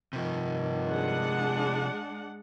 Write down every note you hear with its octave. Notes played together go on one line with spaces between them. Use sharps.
G2 C3 D#3 F3
G#3 D4 F#5